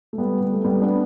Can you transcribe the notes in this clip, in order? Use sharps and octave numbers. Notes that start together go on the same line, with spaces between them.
A3
G3 B3
G3
A3
G3 B3
B3 D4